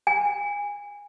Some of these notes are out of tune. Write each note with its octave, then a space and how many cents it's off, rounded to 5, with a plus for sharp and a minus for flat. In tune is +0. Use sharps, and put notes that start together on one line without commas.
G#5 -20